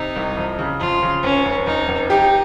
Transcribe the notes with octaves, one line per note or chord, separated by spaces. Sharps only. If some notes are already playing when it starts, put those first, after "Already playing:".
Already playing: C3 D#4
C2
F2
C#3
F2 F4
C#3
F1 C#4
F1
F1 D#4
F1
D#4 G4